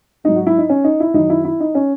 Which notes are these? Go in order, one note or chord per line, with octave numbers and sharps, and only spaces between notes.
G#2 F#3 D#4
F#4
E4
D#4
C#4
D#4
E4
F#2 D#3 F#3 D#4
E4
E4
D#4
C#4